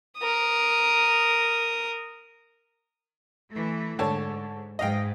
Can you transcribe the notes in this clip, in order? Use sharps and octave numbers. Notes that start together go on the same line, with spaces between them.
A#4 D#6
E3 A3
G#2 D3 C#5 A5
G#2 D#5 F5 G5